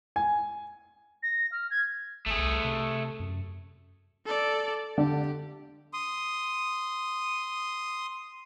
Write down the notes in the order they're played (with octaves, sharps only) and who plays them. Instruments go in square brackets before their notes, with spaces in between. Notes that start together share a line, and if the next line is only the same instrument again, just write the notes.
[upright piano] G#5
[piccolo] A#6
F6
G#6
[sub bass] G#1 [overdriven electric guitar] A3 G#4
[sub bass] C2
C3
F#2
[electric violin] A4 D5
[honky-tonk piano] D3 [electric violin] G4
[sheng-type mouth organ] C6 D#6